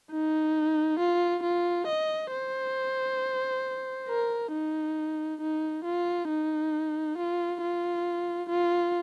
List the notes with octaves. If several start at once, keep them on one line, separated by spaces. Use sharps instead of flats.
D#4
F4
F4
D#5
C5
A#4
D#4
D#4
F4
D#4
F4
F4
F4